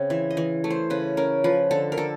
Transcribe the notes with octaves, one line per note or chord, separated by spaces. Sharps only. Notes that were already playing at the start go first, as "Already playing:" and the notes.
Already playing: C#3 C4
E3 E5
D#5
E3
A3
C5
C#3 B4
C#4 A#4
F3 B4
D3 A4
A#4
D3 A4